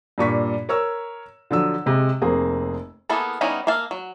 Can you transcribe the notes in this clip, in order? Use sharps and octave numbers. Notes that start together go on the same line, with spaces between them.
G2 A#2 C#6 B6
A#4 C#5 C#6 E6
D3 F3 F#3 E6
C3 G#3
F1 A#3 C4 G#4
A#3 B3 E4 G#4 A4
G3 B3 C#4 D#4 E4
A#3 E5 F5 A5
F#3